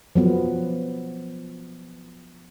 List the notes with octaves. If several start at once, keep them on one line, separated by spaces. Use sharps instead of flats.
F3 F#3 B3